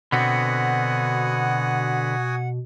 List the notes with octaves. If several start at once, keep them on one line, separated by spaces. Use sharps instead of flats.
B2 D3 B3 C4 F#4 F#5 G#5 D#6